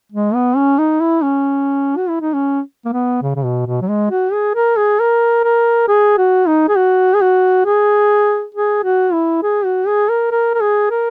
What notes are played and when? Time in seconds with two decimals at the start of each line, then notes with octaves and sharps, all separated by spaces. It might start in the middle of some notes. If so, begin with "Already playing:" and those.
0.12 G#3
0.34 B3
0.56 C#4
0.78 D#4
1.00 E4
1.22 C#4
1.97 F#4
2.09 E4
2.21 D#4
2.34 C#4
2.85 A#3
2.92 B3
3.22 C#3
3.35 C#3
3.44 B2
3.66 B2
3.81 F#3
3.89 G#3
4.11 F#4
4.33 G#4
4.55 A#4
4.77 G#4
5.00 A#4
5.44 A#4
5.88 G#4
6.17 F#4
6.47 D#4
6.69 G#4
6.77 F#4
7.14 G#4
7.21 F#4
7.66 G#4
8.54 G#4
8.83 F#4
9.13 E4
9.43 G#4
9.65 F#4
9.87 G#4
10.09 A#4
10.31 A#4
10.54 A#4
10.61 G#4
10.90 A#4